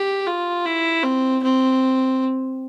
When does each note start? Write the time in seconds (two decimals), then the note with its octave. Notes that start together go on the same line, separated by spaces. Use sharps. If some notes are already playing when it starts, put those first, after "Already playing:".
Already playing: G4
0.27 F4
0.65 E4
1.03 C4
1.43 C4